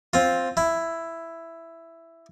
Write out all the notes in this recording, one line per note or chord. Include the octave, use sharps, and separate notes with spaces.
C4 F4
E4